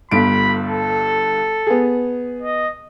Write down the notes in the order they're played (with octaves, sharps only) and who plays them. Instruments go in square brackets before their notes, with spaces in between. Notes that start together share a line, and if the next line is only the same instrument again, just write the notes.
[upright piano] G1 G2 D7 [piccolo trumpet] B5
[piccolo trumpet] A4
[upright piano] B3 G#4
[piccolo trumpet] D#5